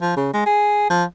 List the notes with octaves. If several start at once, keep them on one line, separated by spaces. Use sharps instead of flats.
F3
C#3
G#3
G#4
F3